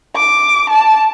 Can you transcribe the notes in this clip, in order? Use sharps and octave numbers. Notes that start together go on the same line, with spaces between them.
D6
A5